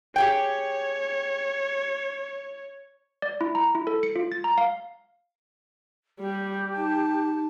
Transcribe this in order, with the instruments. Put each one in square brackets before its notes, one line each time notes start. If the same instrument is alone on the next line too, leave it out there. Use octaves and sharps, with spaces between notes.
[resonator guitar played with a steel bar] G4 G#4 G5 [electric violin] C#5
[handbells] D5
E4
A#5
E4
A4
C#7
F4
A6
A#5
F5
[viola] G3 [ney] G4
[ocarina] D#4 [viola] A5